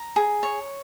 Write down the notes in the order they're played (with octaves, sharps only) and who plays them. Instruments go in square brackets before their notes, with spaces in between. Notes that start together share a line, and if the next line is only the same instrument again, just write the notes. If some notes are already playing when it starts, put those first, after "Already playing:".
Already playing: [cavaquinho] A#5
G#4
C#5